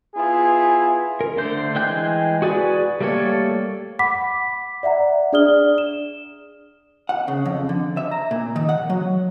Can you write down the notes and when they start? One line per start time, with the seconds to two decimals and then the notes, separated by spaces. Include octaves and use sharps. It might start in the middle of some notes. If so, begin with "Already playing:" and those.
0.14 B3 E4 F4 G#4
1.21 A#4
1.37 D3 A3 C5 G6
1.75 E3 G#3 G5 F#6 G6
2.42 F#4 G#4 B4 D5 G#5
3.01 G3 A3 A#3 A4 C#5
3.99 F#5 B5 D6 B6
4.83 D5 E5 F#5 A#5
5.33 D4 G#4 D5 D#6 F6 G7
5.78 E7
7.09 F#5
7.28 C#3
7.45 F2
7.69 D3
7.97 E5
8.11 A#5
8.31 A#2
8.56 D#3
8.69 F#5
8.90 F#3